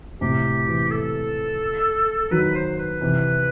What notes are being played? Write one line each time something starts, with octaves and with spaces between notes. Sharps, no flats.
A2 C3 G4
C3 E3
A4
D#3 F#3 B4
C5
B4
C3 E3